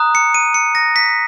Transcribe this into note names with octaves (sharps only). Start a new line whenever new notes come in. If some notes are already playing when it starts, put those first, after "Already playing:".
Already playing: A#5 D#6 F#6
C#7
D#7
C#7
A#6
B6